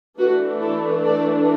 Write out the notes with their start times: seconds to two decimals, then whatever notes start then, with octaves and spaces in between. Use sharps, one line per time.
0.18 E3 A3 D4 F#4 B4
0.61 E4 A4
1.05 A4 D5